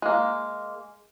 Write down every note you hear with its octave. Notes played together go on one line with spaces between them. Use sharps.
G#3 A#3